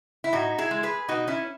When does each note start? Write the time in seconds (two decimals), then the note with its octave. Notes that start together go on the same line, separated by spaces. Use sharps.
0.24 E4
0.33 A2 D#4 F#4
0.58 E4 G#4
0.71 G#3
0.83 G#4 B4
1.08 B2 D#4 F#4
1.27 C#4 E4